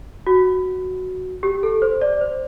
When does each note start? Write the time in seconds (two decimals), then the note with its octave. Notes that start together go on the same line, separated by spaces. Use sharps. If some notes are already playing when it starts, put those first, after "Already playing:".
0.27 F#4
1.43 G4
1.63 A4
1.82 C5
2.01 D5
2.21 C5